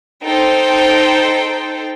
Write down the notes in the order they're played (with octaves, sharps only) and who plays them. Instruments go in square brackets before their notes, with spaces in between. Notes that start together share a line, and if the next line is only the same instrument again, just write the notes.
[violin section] D#4 A4 C5 G5